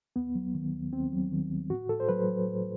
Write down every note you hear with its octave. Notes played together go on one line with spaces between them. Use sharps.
D#2 B3
F#3
D#3
D#2
D#2 C4
F#3
D#3
D#2
A2 F#4
A2 A4
C5
F#3 B4
F#3
A2